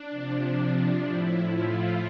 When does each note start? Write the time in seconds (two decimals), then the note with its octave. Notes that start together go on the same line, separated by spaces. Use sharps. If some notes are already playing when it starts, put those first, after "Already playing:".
Already playing: D4
0.10 C3 F3
1.04 A2 F3 E4
1.50 F4